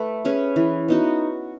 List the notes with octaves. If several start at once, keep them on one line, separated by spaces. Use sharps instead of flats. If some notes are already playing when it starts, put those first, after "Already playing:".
Already playing: A3 B4
C#4 G#4 B4
E3
B3 D#4 F#4